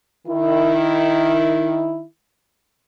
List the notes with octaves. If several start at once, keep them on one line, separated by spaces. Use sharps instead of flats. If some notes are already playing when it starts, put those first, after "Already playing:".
D#3 E4